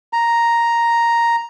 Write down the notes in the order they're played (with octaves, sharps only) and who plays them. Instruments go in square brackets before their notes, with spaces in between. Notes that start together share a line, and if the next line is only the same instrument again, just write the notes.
[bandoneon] A#5